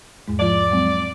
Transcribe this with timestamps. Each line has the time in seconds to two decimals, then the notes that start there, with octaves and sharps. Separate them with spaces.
0.28 E2 G#2 G#3
0.40 F3 F4 D5
0.71 F#3 G#3 C4